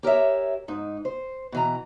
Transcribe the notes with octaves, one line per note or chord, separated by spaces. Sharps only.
G4 A#4 C#5 E5
G#2 D#4
C5
B2 E3 A#5